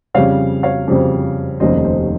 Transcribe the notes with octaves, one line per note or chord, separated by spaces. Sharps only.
F2 C#3 G3 C4 C#5 F5
C#5 F5
F2 C#3 G3 C4
F1 D#2 D#3 G3 C#4 C5 D#5
C5